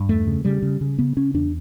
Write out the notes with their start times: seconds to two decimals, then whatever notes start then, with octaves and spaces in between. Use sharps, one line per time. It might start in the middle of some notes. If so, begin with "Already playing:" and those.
Already playing: G2
0.08 E2 A3
0.27 C#3
0.45 C#3 G3
0.62 C#3
0.81 C#3
0.98 C#3 B3
1.17 C#3 C#4
1.34 E2 D4